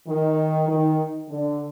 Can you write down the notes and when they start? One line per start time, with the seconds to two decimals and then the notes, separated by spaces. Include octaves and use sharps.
0.08 D#3
0.68 D#3
1.30 D3